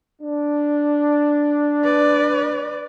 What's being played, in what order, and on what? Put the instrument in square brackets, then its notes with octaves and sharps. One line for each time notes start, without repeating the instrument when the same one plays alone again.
[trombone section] D4
[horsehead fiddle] B4 D5